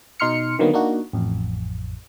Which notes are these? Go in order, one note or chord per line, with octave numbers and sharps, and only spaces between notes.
B2 D#4 C6 F6 C#7
D3 D#3 F#3 A#3 B3
A#3 D4 D#4 F#4
A1 F2